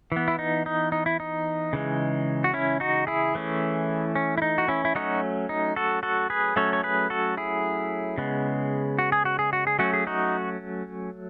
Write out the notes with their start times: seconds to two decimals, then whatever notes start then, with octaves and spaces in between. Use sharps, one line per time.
0.12 E3 B3
0.28 E4
0.39 D#4
0.66 D#4
0.92 D#4
1.06 E4
1.20 D#4
1.73 C#3 E3 G#3
2.44 F#4
2.54 C#4 E4
2.80 D#4 F#4
3.07 E4 G#4
3.35 E3 A3 C#4
4.15 C#4
4.38 E4
4.42 D#4
4.58 F#4
4.68 C#4 E4
4.85 E4
4.95 F#3 A3 C#4 D#4 F#4
5.49 D#4
5.76 F#4 A4
6.03 F#4 A4
6.30 G#4 B4
6.56 F#3 A3 C#4 A4 C#5
6.73 C#5
6.83 G#4 B4
7.10 F#4 A4
7.37 E4 G#4
8.18 C#3 G#3 B3
8.99 F#4
9.12 G#4
9.25 F#4
9.39 G#4
9.53 F#4
9.67 G#4
9.79 F#3 A3 C#4 F#4
9.94 G#4
10.07 D#4 F#4